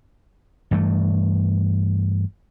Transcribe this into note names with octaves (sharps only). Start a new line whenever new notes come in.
G2 E3 A3